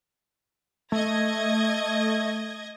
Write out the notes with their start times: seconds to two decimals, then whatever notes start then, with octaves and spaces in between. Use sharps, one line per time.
0.92 A3 D#5 G#6 A#6